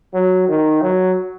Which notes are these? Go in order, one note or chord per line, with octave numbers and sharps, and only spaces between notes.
F#3
D#3
F#3